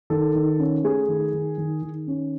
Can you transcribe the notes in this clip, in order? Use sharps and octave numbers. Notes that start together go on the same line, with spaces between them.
D#3 A4
D#3
C#4
A3 G#4
D#3
D#3
D#3
D#3
C#4